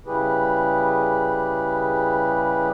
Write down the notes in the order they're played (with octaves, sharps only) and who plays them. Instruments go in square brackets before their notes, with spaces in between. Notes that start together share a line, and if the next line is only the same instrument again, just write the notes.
[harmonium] C#3 G3 E4 G4 G#4 B4